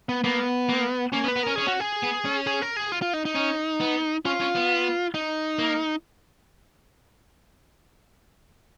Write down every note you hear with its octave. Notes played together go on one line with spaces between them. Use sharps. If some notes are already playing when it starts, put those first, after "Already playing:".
B3
A#3 B3
A#3
A#3 C#4
B3
B4
B3
C#4 A#4
C#4 G#4
F#4
G#4
B3
C#4
G#4
A#4
G#4
F4
F4
D#4
D#4
C#4
B3
C#4 F4
C#4
B3
D#4
A#3